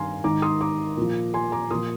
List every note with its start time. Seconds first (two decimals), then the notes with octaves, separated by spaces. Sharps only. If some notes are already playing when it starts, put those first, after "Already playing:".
Already playing: G2 D#3 F5 G#5 A#5 C6
0.24 G#2 D#3 A#5 D6
0.42 C6 D#6
0.61 A#5 D6
0.97 A#2 F3
1.34 G#5 C6
1.52 A#5 D6
1.70 A#2 F3 C6 D#6